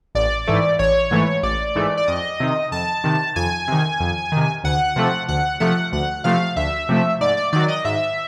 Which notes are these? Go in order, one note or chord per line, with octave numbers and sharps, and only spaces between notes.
A1 D5
G#2 E3 A3
A1 C#5
G#2 E3 A3
A1 D5
G#2 E3 A3
D5
F2 D#5
C3 D#3
F2 A5
C3 D#3
F2 G#5
C3 D#3
F2
C3 D#3
D2 F#5
C3 F3 A3
D2 F#5
C3 F3 A3 F#5
D2 F#5
C3 F3 A3 F5
D2 E5
C3 F3 A3
G#2 D5
D5
D#3 F#3 D5
D#5
G#2 E5